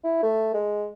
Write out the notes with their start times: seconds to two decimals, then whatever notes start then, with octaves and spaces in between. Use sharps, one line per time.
0.04 E4
0.23 A3
0.54 G#3